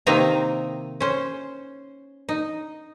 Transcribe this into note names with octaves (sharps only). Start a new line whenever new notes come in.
C3 D#3 A#3 C4 D#4 A#5
C#4 C5
D#4